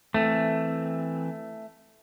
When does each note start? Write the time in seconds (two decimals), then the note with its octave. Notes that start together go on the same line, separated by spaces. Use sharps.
0.14 E3 A3 C4